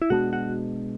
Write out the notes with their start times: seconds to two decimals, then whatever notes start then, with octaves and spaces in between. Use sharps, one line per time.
0.02 E4
0.10 B2 G#3 B3 D4 F#4
0.33 F#4